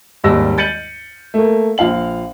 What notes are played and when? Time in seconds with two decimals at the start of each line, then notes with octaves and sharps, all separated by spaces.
0.24 G#1 D#2 G3 E6 A#6
0.58 G6 A6 C#7 D#7 F#7
1.34 A3 A#3
1.78 A#1 F4 F5 F#7